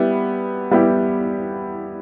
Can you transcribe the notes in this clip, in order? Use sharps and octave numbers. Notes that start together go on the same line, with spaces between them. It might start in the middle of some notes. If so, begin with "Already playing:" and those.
Already playing: G3 B3 E4 G4
G3 B3 E4 G4